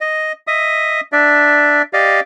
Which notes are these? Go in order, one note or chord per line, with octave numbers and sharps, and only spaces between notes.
D#5
D#5 E5 D#6
D4 D5 E5
G4 D5 D#5 F5